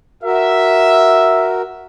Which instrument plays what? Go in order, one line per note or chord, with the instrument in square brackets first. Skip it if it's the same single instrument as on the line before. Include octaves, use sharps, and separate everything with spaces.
[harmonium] F#4 A#4 [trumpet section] E5